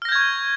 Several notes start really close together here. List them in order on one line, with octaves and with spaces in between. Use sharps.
F6 A#6 G6 G#6 C#6